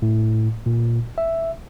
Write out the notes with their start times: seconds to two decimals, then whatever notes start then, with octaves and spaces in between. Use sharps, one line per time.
0.02 A2
0.66 A#2
1.18 E5